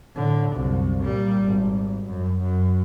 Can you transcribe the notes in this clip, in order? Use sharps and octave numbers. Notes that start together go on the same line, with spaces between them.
A2 D3
C2 F#2
A#2 G3
G#1
F#2
F#2